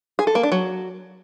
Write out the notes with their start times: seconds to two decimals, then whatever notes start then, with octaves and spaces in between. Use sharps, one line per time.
0.19 G#4
0.27 A4
0.35 A#3
0.43 D4
0.52 F#3